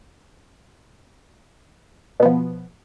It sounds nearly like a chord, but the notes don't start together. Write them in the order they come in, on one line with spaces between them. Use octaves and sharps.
B2 B3 F3